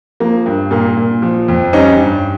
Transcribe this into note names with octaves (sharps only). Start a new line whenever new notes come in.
F3 A#3
G2
A#2 A#3
A#2
F3
F2
G3 C#4 D#4
G2